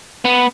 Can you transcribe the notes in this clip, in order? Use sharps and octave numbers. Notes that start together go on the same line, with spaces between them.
B3